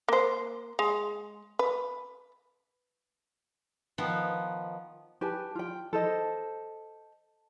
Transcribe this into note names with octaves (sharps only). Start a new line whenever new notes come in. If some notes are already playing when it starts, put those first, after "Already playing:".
A#3 C5
G#3
B4
D#3 F3 B3
G4 B4 G#5 A5
F4 G5
A4 C5 D#5